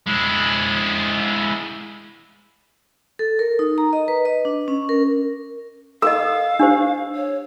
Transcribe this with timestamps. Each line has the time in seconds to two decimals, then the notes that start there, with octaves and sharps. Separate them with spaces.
0.07 G#3 E4
3.19 A4
3.39 A#4
3.59 D#4
3.78 A#5
3.93 D#5
4.08 B4
4.25 D#5
4.45 D4
4.68 C#4
4.89 A#4
6.02 A4 A#4 D#5 F5 E6
6.59 D4 G4 C5
7.15 C#5